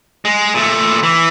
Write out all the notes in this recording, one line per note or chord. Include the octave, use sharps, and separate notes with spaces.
G#3
A#2 A3
E3